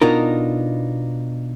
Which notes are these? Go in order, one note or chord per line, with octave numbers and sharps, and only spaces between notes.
B2 D4 D#4 F4 A#4